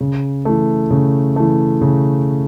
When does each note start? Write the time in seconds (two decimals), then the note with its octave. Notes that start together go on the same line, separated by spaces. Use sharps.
0.01 C#3
0.45 E3 A3
0.91 C#3
1.36 E3 A3
1.82 C#3